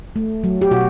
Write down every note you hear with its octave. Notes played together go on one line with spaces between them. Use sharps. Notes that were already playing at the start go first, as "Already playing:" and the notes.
A3
F#3
G4
B2 F#4